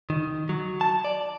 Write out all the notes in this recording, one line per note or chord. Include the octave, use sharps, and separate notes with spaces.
D#3
F#3
A5
D5